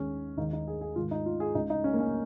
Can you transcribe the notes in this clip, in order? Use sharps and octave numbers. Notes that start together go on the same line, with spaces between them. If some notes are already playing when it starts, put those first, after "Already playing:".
Already playing: D#2 D#3 G#3 C#4
D#2 D#3 G#3 D#4
D#4
G#4
G#4
G#2 D#3 G#3 F4
D#4
F4
G#4
C#2 C#3 G#3 D#4
D#4
C#4
A#3
C#4